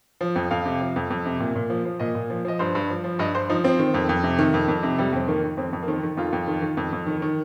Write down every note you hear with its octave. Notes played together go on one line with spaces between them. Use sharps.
F3
F2
F2 F5
C3
F3
F2
F2
C3
A#2
A#2
F3
F3
A#2 D#5
A#2
F3
F3 D#5
G2 C5
G2
F3
F3
G2 D#5
G2 C5
F3 D#4
F3 C4
D#3
F2
F2
C3
D#3
F2
F2
C3
F2 G3
F2 C4
D#3 A#3
D#3
F2 C4
F2
A#3
D#3 C4
D#3
F2 F4
F2
D#3
D#3
F2
F2
D#3
D#3